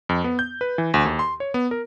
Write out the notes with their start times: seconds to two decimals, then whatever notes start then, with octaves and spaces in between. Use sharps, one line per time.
0.09 F2
0.24 B3
0.39 G6
0.61 B4
0.78 E3
0.94 D2
1.05 D#2
1.19 C6
1.40 C#5
1.54 B3
1.71 A#4